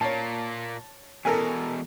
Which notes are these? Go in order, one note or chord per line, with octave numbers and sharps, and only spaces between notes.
A#2 A#3 C#5 A5
E2 B2 A4 A#4 G#5